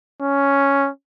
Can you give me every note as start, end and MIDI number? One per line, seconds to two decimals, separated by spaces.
0.22 0.89 61